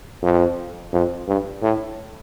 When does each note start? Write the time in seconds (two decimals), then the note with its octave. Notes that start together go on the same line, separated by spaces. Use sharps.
0.23 F2
0.93 F2
1.28 G2
1.62 A2